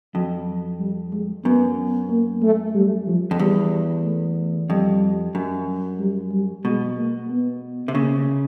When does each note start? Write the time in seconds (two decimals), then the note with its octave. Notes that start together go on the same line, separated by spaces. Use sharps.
0.14 F2 F#3
0.79 G3
1.12 G#3
1.45 F#2 B3
2.09 A#3
2.42 A3
2.74 G3
3.07 F3
3.31 F2
3.39 E2 G3
4.04 A3
4.70 F2 G3
5.35 F#2
5.99 G3
6.32 G3
6.65 B2 G#3
6.97 A#3
7.30 B3
7.88 C3
7.95 C#3 A#3